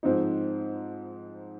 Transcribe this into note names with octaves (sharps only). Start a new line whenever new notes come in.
G#2 F3 C4 D#4